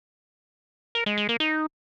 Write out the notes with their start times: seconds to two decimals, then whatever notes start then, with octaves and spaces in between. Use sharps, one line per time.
0.95 A#4
1.06 G#3
1.18 G#3
1.29 A#3
1.40 D#4